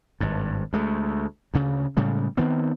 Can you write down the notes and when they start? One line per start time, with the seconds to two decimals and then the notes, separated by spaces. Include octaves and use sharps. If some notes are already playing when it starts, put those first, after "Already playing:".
0.20 G#1 G2
0.73 D2 G#3 A3
1.54 D2 C#3
1.97 A2 C#3 G3 G#3
2.37 D#3 B3 C4